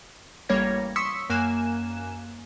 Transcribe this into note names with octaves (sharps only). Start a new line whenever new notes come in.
A1 G3 A#3 C#5 G#6 A#6
C6 C#6 D#6 E6 B6 C#7
F#2 A#3 G#5 F#6 E7